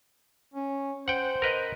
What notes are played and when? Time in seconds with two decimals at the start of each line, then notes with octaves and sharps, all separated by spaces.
0.54 C#4
1.08 C5 F#5 G5
1.42 A#4 B4 D#5